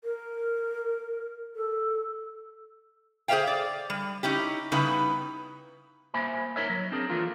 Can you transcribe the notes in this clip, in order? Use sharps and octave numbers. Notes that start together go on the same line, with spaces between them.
A#4
A4
G#4 C5 C#5 E5 F5 G5
D5
G3
C#4 D#4 E4 G4
C#3 G3 B3 D#4 E4 B4
A#3 C5 E5 G#5 B5
D#4 A#4 C#5 E5
F#3
C4 D4 G#4 A#4
E3 F3 A3 A#3 F4